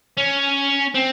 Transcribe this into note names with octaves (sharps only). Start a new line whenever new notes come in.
C#4
C4